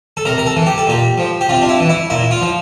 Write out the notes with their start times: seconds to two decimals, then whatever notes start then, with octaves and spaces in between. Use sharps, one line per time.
0.17 A4
0.25 C3 A#4
0.38 A#4
0.46 A4
0.56 E3
0.67 G4
0.78 A4
0.87 A#2 G4
1.18 F3
1.41 G4
1.49 C3 F4
1.62 D4
1.69 E4
1.80 E3
1.89 E4
2.10 A#2 E4
2.31 F4
2.41 F3